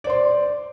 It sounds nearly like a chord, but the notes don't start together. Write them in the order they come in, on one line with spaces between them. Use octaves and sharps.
D5 C5 C6